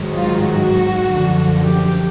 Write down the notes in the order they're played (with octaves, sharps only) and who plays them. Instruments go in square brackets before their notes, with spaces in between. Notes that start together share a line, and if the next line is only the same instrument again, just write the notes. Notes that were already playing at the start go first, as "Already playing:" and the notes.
Already playing: [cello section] G#2 D#3 F#3
F4
F#4
F#2 D3 F3
G4